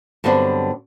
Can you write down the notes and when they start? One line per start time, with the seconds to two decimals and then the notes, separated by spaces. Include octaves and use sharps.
0.24 G2 D3 F#3 B3 C4 D4